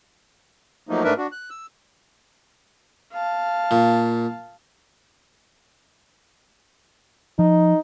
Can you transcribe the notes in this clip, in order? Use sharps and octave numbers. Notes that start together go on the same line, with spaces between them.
F3 F#3 A3 A#3 D#4
G#2 A3 D4 A#4 B4 E5
D4 F#4
F#6
E6
F5 A5
A#2
F3 D#4